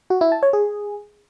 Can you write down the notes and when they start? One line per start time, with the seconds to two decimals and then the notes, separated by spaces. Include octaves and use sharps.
0.10 F#4
0.21 E4
0.32 A5
0.43 C#5
0.53 G#4